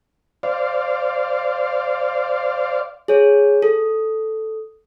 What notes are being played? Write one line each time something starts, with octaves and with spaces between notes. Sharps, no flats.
C5 D5 F5
G#4 C#5
A4